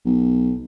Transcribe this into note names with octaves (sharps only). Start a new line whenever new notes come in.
B1